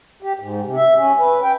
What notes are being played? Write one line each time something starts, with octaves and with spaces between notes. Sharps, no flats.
G4
G#2
C3
E5
C#4
B4
G5